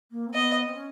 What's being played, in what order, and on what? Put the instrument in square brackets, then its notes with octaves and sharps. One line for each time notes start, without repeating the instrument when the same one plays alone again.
[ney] A#3
C4
[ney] B3 [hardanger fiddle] D#5
[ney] C4
C#4